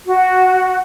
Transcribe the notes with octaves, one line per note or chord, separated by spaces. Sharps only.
F#4